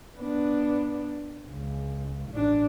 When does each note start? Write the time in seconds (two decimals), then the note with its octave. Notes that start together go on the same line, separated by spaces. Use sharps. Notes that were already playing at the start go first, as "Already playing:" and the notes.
0.17 B3 D4
1.50 C#2
2.31 A1 D4